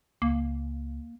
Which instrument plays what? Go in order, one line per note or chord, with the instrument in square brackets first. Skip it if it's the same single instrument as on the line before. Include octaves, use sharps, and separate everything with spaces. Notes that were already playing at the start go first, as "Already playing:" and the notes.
[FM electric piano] C#2 [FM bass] A#3